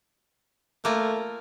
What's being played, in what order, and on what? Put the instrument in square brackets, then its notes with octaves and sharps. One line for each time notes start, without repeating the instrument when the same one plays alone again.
[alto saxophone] A3 [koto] A#3 F4 G#5